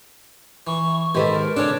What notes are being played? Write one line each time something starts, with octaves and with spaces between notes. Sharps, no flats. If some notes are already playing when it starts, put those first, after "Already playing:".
E3 C#6
G#2 D#3 G4 A4 B4 C5
A#4
C#3 C#4 D4 A4 C#5